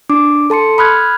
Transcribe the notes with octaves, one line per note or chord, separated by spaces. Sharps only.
D4 D6
A4 A5 C6 C#7
B5 D#6 F6 F#6 G#6